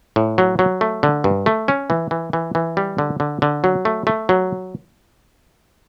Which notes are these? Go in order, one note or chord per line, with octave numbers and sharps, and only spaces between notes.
A2
F#3
F#3
A3
D3
G2
A3
C#4
E3
E3
E3
E3
G3
D3
D3
D3
F#3
A3
A3
F#3